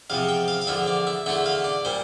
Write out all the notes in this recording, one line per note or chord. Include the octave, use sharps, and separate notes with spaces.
E2 C3 F3 F5
G5
F5
F5
E2 D3 F3 E5
D5
E5
E2 D3 A3 E4 E5
F5
D5
A#2 G3 C5